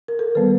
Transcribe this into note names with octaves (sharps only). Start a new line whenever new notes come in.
A#4
A4
D#3 G3 B3 B4